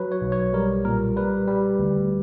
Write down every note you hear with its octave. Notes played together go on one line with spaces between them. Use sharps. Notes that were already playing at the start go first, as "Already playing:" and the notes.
Already playing: F#3 B4
C#5
B1
C#5
G3 A#4
A#2 A#4
G3 B4
G3
D2